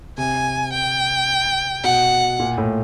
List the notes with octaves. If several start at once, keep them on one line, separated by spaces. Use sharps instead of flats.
C3 G#5
G5
B2 F#5
A#2
A2